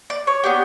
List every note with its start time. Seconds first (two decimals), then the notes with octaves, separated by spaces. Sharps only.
0.10 D5
0.27 C#5
0.44 B3 D4 G4